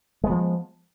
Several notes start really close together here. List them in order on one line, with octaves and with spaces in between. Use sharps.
G#3 B3 F3